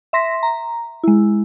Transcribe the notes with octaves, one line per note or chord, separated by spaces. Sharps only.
E5 C6 A#6 B6
A#5
G#3 E4